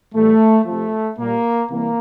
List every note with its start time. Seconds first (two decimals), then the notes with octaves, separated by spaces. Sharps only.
0.14 A2 E3 G3 A3
0.65 C3 F3 A3
1.17 A#2 G3 A#3
1.70 C3 E3 G3 A#3